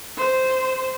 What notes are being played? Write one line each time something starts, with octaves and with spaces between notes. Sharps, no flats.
C5